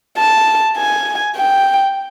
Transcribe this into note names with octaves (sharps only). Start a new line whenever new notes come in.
A5
G#5
G5